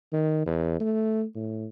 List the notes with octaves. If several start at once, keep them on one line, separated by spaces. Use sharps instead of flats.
D#3
E2
A3
A2